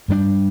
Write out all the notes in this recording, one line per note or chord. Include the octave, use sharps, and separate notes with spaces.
G2 G3 B3 D4